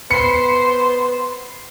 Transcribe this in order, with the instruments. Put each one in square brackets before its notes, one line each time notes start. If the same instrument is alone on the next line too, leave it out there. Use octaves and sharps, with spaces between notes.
[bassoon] B3 [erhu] C5 [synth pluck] B5 C7 [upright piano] C#7